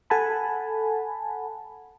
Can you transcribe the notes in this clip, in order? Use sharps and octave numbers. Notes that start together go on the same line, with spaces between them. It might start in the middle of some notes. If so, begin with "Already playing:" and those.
A4 F#5 G#5 A5 B5